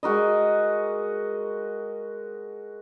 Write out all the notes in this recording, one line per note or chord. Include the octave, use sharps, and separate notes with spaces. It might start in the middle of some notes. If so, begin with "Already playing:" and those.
G#3 F#4 A#4 D#5